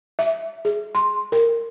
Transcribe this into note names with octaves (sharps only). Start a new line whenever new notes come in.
E5
G#4
C6
A#4